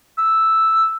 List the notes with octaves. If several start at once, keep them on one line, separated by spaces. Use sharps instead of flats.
E6